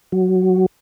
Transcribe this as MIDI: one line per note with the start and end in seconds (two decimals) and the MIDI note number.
0.12 0.66 54